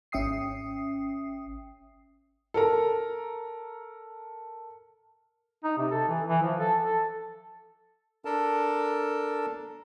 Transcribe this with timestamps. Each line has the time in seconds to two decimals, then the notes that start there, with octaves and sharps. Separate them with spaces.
0.12 G#1 C#4 E5 G5 D#6 C7
2.54 A4 A#4 A#5
5.64 D#4
5.78 C3
5.91 A4
6.09 E3
6.28 E3
6.43 F3
6.59 A4
6.83 A4
8.25 D4 A4 A#4 A5